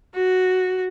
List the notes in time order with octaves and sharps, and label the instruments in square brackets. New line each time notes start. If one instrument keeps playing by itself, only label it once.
[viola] F#4